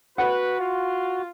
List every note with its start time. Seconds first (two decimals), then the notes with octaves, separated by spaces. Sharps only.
0.18 F#4 B4 F#5
0.59 F4